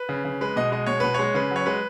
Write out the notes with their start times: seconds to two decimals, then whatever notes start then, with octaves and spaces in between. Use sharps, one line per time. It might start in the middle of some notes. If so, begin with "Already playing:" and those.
Already playing: B4
0.09 C#3
0.25 C#3
0.41 G#3 B4
0.56 B2 D#5
0.72 G#3 D#5
0.87 B2 C#5
1.00 B2 B4
1.14 G#3 C#5
1.34 C#3 B4
1.51 F#3
1.56 C#5
1.66 G#3 B4